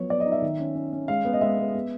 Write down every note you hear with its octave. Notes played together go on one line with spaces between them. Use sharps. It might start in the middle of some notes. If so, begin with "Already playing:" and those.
Already playing: F3 F#3 B3 C#5
B3 D5
D#5
D#4
E5
D#3
C#4
C#4
C#4
G#3 F5
B3
D#5
G#3 E5
B3
B3